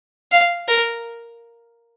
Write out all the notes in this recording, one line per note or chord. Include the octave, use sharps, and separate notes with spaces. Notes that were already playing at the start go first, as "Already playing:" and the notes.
F5
A#4